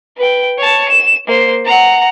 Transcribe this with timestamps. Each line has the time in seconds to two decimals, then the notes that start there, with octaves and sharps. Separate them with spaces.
0.17 B4 G5
0.58 C#5 A5
0.89 E7
1.27 A#3 C5
1.65 F#5 A#5